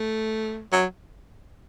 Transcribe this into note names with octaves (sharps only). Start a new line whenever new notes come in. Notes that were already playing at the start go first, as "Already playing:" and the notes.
Already playing: A3
F#3